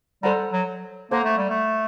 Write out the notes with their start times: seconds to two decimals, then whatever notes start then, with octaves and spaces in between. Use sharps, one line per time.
0.23 G3 A4 C5 F#5 A#5
0.53 F#3
1.11 A#3 A4 C5 F#5 A#5
1.24 A3
1.37 G3
1.50 A3